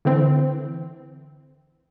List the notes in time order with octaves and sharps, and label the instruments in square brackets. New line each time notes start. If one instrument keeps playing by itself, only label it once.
[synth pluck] D3 E3 C4